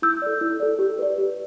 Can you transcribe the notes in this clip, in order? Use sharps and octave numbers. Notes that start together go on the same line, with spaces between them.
E4 E6 G6
A4 D5
E4
A4 D5
G4
B4 D5
G4